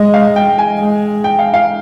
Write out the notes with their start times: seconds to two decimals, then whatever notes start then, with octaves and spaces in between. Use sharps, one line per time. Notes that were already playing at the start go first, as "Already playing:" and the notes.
Already playing: G#3 D#5
0.14 F5
0.36 G5
0.59 G#5
0.80 G#3
1.24 G5
1.39 F5
1.54 F5